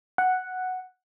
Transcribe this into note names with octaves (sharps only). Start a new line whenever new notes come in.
F#5